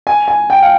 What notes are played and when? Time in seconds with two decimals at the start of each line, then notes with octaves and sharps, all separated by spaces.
0.07 G#5
0.28 G#5
0.50 G5
0.62 F5